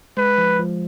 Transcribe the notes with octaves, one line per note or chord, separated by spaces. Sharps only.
G#3 B4
F3
F3